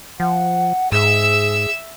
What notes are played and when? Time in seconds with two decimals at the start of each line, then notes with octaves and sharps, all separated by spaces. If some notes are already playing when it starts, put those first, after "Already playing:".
0.20 F3 F#5
0.92 G#2 G#4 E5 E6